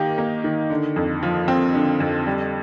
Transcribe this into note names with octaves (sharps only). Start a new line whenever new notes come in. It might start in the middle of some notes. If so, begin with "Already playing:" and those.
Already playing: D#3 A#3 D#4 G4
A#3
D#3
D3
F2
F3
C4
D3
F2
G3